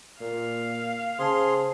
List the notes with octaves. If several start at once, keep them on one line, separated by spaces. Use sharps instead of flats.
A#2 F5
C#3 G#4 C5 A5 C6